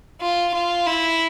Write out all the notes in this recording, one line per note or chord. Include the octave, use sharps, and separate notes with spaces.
F4
F4
E4